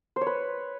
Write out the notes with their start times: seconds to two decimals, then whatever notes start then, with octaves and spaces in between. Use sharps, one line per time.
0.16 C5
0.21 C#5
0.26 B4